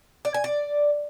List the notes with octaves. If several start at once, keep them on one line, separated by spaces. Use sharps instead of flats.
D5
G#5
D5